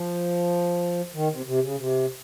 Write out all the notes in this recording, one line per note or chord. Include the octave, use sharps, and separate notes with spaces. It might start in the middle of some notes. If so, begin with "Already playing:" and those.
Already playing: F3
D#3
C3
C3
C#3
C3